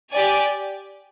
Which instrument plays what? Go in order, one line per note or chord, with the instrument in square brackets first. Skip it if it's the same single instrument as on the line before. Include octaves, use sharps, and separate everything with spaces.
[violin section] G4 D5 G#5